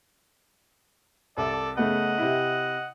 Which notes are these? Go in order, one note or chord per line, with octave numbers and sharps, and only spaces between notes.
C2 A4 D5
C#3 A3 B3 D#5 F#5
C3 E4